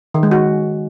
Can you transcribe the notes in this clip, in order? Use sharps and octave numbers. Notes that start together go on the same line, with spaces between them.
D#3
G#3
F#4